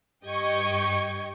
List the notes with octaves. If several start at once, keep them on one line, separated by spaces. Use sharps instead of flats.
G2 G4 D#5 G5 C#6 G#6